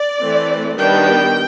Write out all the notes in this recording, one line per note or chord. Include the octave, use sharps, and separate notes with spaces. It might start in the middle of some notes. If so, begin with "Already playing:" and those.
Already playing: D5
E3 A3 C4
D#3 G3 B3 D4 G5